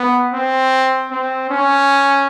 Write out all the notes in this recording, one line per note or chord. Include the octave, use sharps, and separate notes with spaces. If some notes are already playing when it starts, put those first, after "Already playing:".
Already playing: B3
C4
C4
C#4